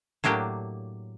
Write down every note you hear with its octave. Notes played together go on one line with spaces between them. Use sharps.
A2 F#3 A#3 D4 G4